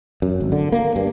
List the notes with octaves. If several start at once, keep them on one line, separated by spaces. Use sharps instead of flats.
F#2
G#1
D3
A#3
G2